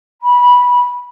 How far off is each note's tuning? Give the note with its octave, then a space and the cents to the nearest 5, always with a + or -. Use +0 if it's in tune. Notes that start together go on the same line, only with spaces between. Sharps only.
B5 -15